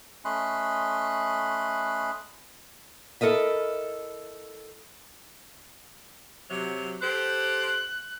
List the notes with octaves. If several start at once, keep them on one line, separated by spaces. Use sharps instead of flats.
A3 C#4 D#5 B5 C6 F#6
E4 A4 A#4 D#5 E5
C3 F#3
G4 A4 C5 F#6